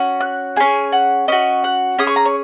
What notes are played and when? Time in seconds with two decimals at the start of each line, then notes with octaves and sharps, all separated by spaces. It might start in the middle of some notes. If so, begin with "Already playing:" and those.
Already playing: C#4 F#4
0.21 F#6
0.56 C#4 G#4 G#5
0.92 F#5
1.28 C#4 F#4 D#5
1.64 F#5
1.98 C#4 G#4 D#6
2.07 C#6
2.16 A#5
2.25 C#5